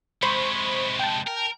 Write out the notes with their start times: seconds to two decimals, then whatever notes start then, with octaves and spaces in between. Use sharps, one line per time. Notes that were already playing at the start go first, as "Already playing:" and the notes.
0.22 C3 G#3 C5 B5 C#6
0.99 G5 A5
1.27 A#4